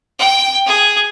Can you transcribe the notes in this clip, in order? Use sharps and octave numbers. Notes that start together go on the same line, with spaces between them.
G5
G#4